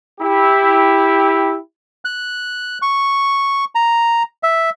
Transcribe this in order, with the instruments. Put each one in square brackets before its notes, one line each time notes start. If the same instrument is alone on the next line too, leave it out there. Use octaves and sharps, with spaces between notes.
[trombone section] E4 G4
[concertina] F#6
C#6
A#5
E5